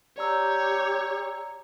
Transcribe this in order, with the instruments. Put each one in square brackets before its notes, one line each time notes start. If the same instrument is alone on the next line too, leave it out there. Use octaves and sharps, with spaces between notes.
[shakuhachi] G4 [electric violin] C#5 [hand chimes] D5 A#5 E6